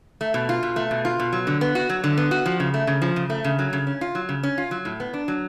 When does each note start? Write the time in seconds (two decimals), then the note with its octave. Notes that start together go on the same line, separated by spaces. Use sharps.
0.21 A3
0.34 B2
0.49 F4
0.63 B2
0.76 A3
0.91 B2
1.05 F4
1.20 B2
1.33 F#3
1.47 D3
1.61 B3
1.75 F#4
1.89 F#3
2.04 D3
2.18 B3
2.31 F#4
2.46 F3
2.60 C#3
2.74 A3
2.87 C#3
3.02 F3
3.16 C#3
3.30 A3
3.44 C#3
3.59 F#3
3.73 C#3
3.87 C#4
4.01 F4
4.15 F#3
4.29 C#3
4.43 C#4
4.58 F4
4.71 F#3
4.85 A2
5.00 B3
5.14 D4
5.28 F#3